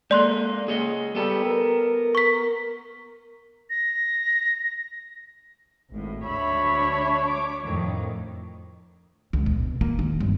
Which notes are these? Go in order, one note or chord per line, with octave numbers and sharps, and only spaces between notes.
G#3 A#3 A4 D5 C6 F#6
G#4 C#5 D#5
G3 B3 A4 A5
A#4
C#6 B6
A#6
G#1 A2
D2 D4 C#5 E5 B5
D6
F2 A2 D#3
C#2
B2
A#3
D#2
G1